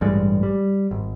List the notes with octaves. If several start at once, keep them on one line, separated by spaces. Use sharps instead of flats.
A1 G2 G3 G#3
G3
G#1